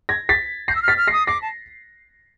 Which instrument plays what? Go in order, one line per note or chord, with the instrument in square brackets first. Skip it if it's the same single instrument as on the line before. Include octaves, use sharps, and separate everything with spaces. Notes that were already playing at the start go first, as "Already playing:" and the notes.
[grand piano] G#6 A#6
A6 B6
[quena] G6 [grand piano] A#6 C7
[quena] E6
F6
[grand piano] A6 B6
[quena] F6
[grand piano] A#6 C7
[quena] D#6
[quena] D6 [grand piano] A#6 C7
[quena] A5